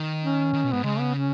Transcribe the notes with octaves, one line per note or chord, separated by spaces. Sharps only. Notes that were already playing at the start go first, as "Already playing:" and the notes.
Already playing: D#3
C#4
D#3
B2
G#2 B3
C#3 G#3
B3
C#4